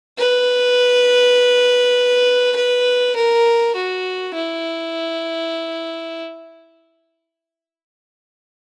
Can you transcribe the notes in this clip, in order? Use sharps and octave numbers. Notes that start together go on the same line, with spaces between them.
B4
B4
A#4
F#4
E4